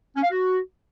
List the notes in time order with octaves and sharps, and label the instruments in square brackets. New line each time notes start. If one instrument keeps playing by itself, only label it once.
[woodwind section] C#4
F5
F#4